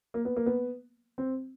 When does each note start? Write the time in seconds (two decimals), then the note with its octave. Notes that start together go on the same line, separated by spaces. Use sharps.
0.14 A#3
0.25 B3
0.36 A#3
0.46 B3
1.18 C4